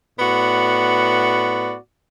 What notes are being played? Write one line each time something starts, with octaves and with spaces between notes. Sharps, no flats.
A2 B3 F#4 D5